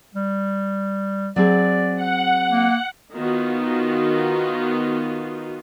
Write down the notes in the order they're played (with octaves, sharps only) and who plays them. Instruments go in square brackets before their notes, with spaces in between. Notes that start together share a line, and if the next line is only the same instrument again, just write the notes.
[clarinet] G3
[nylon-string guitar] F#3 C4 G#4 [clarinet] D5
[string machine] F#5
[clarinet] A#3
[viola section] D#3 B3 D#4 F4 F#4